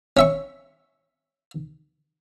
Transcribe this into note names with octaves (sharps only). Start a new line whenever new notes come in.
C#4 E5 C#6